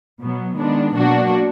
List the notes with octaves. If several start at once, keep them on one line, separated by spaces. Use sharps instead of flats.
B2 F#3 B3
D#3 G#3 B3 D4
B2 F#3 A#3 D4 F#4